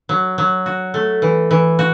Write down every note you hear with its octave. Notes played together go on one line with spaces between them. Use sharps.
F#3
F#3
F#4
A3
E3
E3
F#4